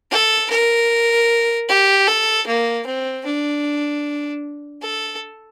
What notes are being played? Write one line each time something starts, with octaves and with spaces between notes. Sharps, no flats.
A4
A#4
G4
A4
A#3
C4
D4
A4